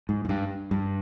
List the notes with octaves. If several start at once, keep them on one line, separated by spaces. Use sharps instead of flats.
G#2
G#2
G2
G2